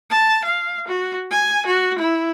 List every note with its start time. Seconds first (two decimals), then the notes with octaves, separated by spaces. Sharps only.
0.10 A5
0.45 F5
0.88 F#4
1.32 G#5
1.66 F#4
1.99 E4